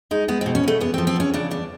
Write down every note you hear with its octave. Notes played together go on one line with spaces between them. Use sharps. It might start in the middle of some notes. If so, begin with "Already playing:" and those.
G#3 D#4
G#3 B3
C4
B2
C#4
B2 A3
E2 B3
C4
F3
C4
E2 C#4
C#3 D4
E2 D4